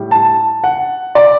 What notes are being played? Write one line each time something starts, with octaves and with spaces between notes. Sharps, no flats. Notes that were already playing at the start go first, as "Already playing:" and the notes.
Already playing: A2 G3
A5
F#5
D5